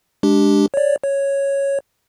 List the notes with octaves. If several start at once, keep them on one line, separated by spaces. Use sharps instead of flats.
G#3 D4 G4
C#5 D5
C#5